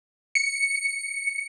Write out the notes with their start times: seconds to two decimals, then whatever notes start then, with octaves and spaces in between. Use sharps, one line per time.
0.35 C#7